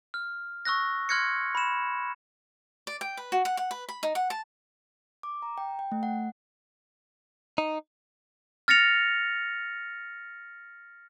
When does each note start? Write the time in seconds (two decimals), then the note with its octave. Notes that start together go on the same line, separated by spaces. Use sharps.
0.14 F6
0.65 C#6 E6 F#6 A#6
1.09 C6 F6 F#6 G#6 A#6 C#7
1.55 B5 E7
2.87 D5
3.01 G5
3.17 B4
3.32 F#4
3.45 F#5
3.57 F#5
3.71 B4
3.89 B5
4.03 D#4
4.15 F#5
4.30 A5
5.23 D6
5.42 A#5
5.58 G5
5.79 G5
5.92 A3
6.03 F#5
7.58 D#4
8.68 F6 A6 A#6 C#7 F7